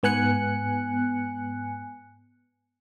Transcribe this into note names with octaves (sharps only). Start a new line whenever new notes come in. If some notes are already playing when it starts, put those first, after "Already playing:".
G#2 B3 G#5 F#6 C#7